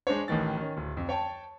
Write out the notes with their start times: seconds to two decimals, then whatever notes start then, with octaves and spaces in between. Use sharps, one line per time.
0.07 G#3 D4 C5 C#5
0.28 A1 A2 D#3 E3 A6
0.57 D#3 C#4
0.77 D1
0.97 F2
1.09 C#5 G5 A5